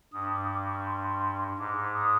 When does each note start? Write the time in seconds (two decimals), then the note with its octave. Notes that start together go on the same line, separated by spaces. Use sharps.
0.13 G2 D#6
0.31 D6
0.44 D#6
0.49 D6
0.68 C#6
0.86 C6
1.58 G#2 D6
1.94 D#6